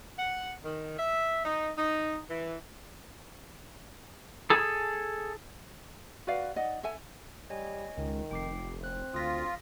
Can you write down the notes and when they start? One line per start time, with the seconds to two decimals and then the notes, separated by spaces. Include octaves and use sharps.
0.19 F#5
0.65 D#3
0.99 E5
1.45 D#4
1.78 D#4
2.30 E3
4.50 G#4 A4
6.27 F#4 B4 D5 F5
6.56 D#4 D5 D#5 F#5
6.83 A4 E5 G#5
7.50 G3 C#5 D#5 G#5
7.97 C#2 D#3
8.31 F1 G5 D6 C7
8.84 C4 F#6
9.14 D2 F4 D#6 A#6 B6